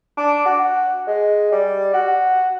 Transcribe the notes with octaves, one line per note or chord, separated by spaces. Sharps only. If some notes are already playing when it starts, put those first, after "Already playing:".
D4
F#4
G#3
G3
F#4